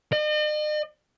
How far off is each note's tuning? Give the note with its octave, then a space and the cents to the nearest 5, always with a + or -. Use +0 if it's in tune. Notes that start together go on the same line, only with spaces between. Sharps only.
D#5 -45